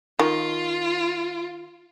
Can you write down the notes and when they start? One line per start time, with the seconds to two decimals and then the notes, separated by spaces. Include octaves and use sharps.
0.19 D#3 F4